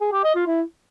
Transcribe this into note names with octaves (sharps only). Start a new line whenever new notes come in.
G#4
G4
D#5
F4
E4